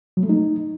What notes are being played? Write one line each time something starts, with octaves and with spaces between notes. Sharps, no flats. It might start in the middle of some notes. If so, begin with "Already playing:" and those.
F#3
A3
D#4